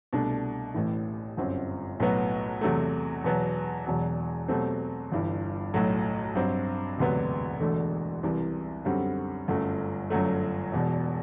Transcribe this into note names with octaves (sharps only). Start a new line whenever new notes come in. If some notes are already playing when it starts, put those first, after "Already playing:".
C2 B2 A3 D4
A1 A2 E3
G1 F#2 F#3 C4
B1 A2 F#3 B3 F#4
E2 C3 F#3 A3
E2 B2 F#3 B3
E1 E2 B2 F#3
B2 F#3 A3 C4 G4
G1 G2 E3
B1 A2 F#3 A3
G2 F#3 C4
E1 D2 C3 F#3 B3
E1 E2 D3 A3
C2 C3 E3
F#2 D3 G3 C4 F#4
G1 F#2 F#3 A3
G1 F#2 F#3 A3
E1 E2 B2